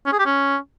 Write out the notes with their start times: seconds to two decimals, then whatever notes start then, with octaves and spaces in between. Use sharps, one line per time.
0.06 C#4
0.12 G#4
0.19 G4
0.26 C#4